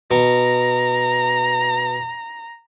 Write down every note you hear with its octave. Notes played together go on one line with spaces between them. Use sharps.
B2 A#5